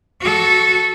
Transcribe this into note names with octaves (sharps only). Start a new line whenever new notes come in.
F#4 A4